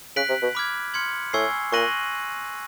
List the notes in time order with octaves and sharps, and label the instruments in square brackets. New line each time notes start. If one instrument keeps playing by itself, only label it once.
[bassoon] C#3 [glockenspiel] F#6 B6 D7 F#7
[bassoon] C3
B2
[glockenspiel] B5 D6 F6 G#6
C6 F6 G#6 C#7 F#7
[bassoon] A2 [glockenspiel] G#5 C#6 E6 G#6 C7
[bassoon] A#2 [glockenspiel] C#6 F#6 A#6 D#7 F#7